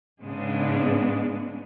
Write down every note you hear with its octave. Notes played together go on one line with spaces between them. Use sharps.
G#2 C#3 G#3 B3 D4